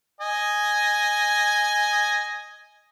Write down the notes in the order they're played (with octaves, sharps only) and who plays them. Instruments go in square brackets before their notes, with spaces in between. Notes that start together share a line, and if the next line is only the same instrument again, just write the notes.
[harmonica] D#5 G#5